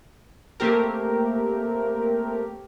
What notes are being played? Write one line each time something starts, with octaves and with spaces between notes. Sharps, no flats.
A3 A#3 C4 G4 A#4